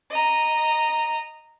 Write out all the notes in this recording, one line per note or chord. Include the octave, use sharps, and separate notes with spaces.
D#5 A#5